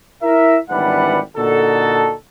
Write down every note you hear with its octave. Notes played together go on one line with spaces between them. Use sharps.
E4 A#4 E5
G#1 E3 G3 D4 B4 F#5
A#2 D3 D#4 F#4 A4